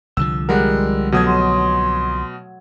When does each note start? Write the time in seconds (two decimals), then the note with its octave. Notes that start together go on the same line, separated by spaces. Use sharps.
0.17 C2 D3 F3 E6
0.49 G3 G#3 A#4 F#5 C6 F#6
1.12 B2 F#3 A3 D#6 G#6
1.27 C6 A#6 E7